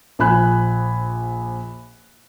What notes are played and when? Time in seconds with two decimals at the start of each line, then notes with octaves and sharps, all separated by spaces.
0.19 A#1 F3 G#5 B5 F#6